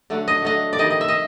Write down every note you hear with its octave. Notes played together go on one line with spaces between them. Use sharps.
D3 F#3 A3
D#5
D3 F#3 A3 D#5
D5
C3 D#3 G3 D#5
D#5
E5
D#5